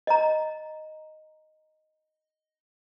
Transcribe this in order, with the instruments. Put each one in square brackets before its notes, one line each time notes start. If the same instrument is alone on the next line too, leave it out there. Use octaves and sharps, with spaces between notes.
[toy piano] D#5 A#5